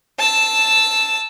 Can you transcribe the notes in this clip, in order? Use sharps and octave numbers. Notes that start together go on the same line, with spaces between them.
A5 E6